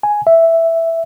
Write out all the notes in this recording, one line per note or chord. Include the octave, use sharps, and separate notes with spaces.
G#5
E5